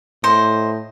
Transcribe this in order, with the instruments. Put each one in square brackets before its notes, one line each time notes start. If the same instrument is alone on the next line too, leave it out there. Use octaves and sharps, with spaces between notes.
[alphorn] A2 [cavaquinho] C5 D#5